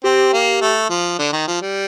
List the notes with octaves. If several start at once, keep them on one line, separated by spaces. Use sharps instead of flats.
C4 G4
A#3
A3
F3
D3
D#3
F3
G3